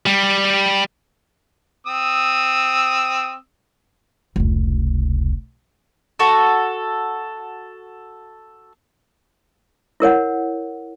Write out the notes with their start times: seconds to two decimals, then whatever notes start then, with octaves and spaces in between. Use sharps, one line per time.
0.06 G3
1.87 C4 D#6 E6
4.36 F1 C#2
6.19 F#4 A4
10.00 E4 A#4 C#5 F#5